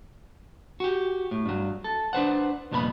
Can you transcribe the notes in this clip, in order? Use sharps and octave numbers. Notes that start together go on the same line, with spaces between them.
F#4 G4
A2
G2 F#3
A4
D4 B4 C5 F#5
C2 F2 A#2 B3 G#5 B5